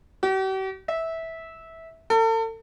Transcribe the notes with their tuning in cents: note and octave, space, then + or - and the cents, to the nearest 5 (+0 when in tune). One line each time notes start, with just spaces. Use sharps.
G4 -45
E5 -15
A4 +40